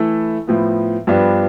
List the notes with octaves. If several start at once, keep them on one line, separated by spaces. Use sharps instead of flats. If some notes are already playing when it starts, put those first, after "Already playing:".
Already playing: E3 A3 E4 A4
A2 F3 B3
G2 F3 B3 D4 G4